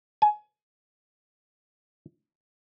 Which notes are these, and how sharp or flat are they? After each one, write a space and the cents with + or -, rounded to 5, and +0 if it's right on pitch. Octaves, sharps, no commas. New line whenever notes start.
G#5 +25